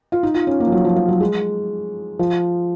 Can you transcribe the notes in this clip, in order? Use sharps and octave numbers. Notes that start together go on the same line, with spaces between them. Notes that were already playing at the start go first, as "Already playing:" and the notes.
F4
D#4
F4
C#4
A#3
F3
F#3
F3
F3
F#3
G#3
F3